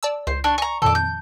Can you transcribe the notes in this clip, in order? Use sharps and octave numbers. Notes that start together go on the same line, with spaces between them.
D5 A5 E6
C#2 C5
D4 C#6
G#5 A#5 C#6
F2 A#2 D#3 A4 D6
G6